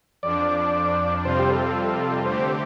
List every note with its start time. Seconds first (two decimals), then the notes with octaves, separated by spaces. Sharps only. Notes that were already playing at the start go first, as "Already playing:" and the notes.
0.23 F2 F3 D4 D5
1.24 F2 C3 G3 C4 F4 C5
1.39 G4
1.50 A4
2.26 D3 A3 C4 G4 C5